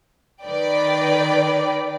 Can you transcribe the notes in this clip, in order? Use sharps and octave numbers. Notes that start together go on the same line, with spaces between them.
D#3 B4 D5 G5